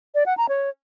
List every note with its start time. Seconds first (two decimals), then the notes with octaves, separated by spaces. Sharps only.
0.15 D5
0.26 F#5
0.37 A#5
0.49 C#5